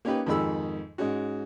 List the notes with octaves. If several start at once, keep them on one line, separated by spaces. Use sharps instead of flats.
A#3 C#4 D#4 G4 B4
F2 G#2 D#3 G#4 B5 E6
G#2 G#3 C#4 F#4